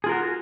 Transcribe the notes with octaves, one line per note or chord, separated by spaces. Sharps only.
F4 F#4 G#4 A#4